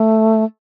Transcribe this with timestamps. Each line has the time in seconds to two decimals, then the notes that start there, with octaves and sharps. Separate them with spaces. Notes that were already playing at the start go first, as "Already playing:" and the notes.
Already playing: A3